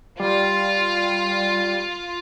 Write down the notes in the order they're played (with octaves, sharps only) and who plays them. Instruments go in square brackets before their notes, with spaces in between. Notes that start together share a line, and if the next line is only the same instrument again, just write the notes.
[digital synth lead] G3 [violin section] F4